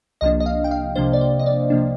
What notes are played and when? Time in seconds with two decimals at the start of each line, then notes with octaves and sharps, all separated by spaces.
0.21 C2 C3 F3 A#3 D4 D#5
0.40 D#5
0.46 F5
0.64 G5
0.71 F5
0.95 C2 C3 F3 A#3 D4 C5
1.13 D5
1.21 C5
1.39 D#5
1.46 D5
1.70 C3 F3 A#3 D4